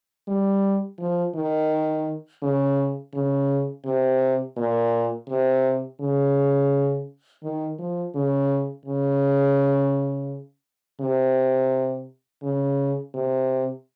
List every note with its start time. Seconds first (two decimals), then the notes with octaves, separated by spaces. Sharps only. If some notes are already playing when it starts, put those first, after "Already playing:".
0.28 G3
0.99 F3
1.35 D#3
2.42 C#3
3.13 C#3
3.86 C3
4.57 A#2
5.28 C3
6.00 C#3
7.43 D#3
7.79 F3
8.15 C#3
8.86 C#3
11.00 C3
12.43 C#3
13.14 C3